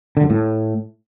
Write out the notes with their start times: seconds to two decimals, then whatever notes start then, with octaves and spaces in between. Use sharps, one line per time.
0.17 D3
0.23 F#2
0.30 A2